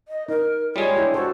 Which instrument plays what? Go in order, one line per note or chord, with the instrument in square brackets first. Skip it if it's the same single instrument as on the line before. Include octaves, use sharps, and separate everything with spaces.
[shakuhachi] D#5
[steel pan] D#4 [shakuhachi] A#4
[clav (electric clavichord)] G3 G#3 [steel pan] F4 [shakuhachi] C#5
[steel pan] D4 E4 G4
[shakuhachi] F#4 [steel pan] A4 C5 C#5